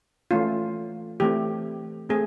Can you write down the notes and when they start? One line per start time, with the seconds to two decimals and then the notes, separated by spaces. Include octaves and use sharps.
0.31 E3 A3 C#4 F4
1.20 E3 A3 C4 G4
2.09 A3 C4 G#4